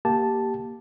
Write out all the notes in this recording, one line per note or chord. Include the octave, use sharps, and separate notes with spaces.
A#3 G4 A5